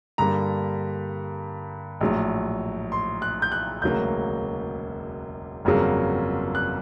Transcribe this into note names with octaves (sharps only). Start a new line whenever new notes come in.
G2 D3 G3 A#3 A#5
A#1 A2 F#3
C6
F#6
G6
F#6
E1 D2 C#3 F#3 A#3 G6
G1 F2 C#3 F#3 A#3
F#6